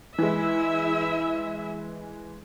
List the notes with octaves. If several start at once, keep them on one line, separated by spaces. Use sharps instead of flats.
E3 G#3 E4 E5